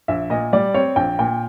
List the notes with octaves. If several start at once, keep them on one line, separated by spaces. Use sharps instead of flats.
A#1 E5
A#2 D#5
G3 D5
C4 C#5
A#1 G5
A#2 G5